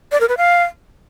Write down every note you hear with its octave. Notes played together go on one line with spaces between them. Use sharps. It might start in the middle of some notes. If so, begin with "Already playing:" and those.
D5
A#4
B4
F5